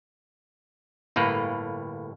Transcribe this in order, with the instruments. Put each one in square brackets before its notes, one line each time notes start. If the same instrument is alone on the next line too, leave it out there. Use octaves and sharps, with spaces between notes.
[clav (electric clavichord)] G1 A2 A#3 B4